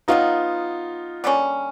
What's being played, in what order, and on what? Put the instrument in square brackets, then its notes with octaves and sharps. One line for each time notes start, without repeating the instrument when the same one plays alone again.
[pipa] B2 F#3 B3 [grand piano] D#4 F4
[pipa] D3 G3 A#3 C#4